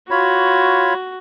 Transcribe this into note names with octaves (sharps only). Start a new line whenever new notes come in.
F4 F#4 C#5 B5